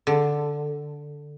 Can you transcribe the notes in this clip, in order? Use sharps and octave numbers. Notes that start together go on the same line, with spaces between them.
D3